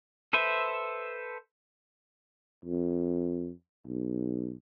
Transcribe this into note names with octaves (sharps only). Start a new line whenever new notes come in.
A4 B4 C5 E5
F2
B1